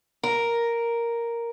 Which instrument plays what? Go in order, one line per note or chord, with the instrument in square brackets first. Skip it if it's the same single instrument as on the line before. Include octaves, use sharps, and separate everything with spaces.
[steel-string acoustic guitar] A#4